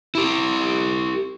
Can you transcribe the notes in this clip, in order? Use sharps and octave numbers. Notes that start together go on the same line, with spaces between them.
E4 G4